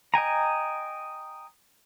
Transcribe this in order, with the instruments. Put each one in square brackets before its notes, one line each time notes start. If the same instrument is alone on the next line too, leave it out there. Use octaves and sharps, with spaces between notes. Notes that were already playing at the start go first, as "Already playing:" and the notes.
[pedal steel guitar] D#5 G5 G#5 A#5